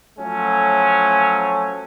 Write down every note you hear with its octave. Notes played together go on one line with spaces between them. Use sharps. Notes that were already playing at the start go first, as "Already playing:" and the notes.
F3 F#3 A3 C#4